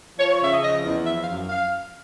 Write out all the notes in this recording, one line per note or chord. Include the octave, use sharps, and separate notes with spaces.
F3 C#5
C#5
C#3 E5
D#5
F3 D#5
E2
F3 E5
F5
F#2
F5